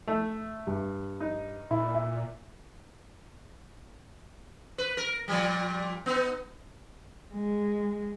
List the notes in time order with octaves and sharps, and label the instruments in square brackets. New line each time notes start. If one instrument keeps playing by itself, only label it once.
[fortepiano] A3
[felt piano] G2
[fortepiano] D#4
[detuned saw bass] A#2 [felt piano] E4
[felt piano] E5
[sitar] B4
A#4
A#2 F3 G3
B3 D#4
[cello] G#3